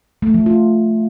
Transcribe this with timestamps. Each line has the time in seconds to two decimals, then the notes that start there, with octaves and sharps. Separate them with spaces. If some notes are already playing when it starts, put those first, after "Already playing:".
0.22 A3
0.34 F3
0.46 F4